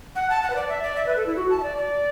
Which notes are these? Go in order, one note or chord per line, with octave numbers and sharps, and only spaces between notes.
F#5
A5
F#5
B4
D5
E5
D5
E5
B4
A4
E4
F#4
A5
E5
D5
D5